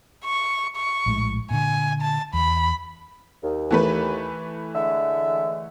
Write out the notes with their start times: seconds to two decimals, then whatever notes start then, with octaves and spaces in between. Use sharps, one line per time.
0.24 C#6
0.76 C#6
1.06 A#1 A2 G#3
1.51 A#2 D3 G#5
2.02 A5
2.33 E2 B5
3.43 D#2
3.71 E3 A3 B4
4.75 D3 G#3 E5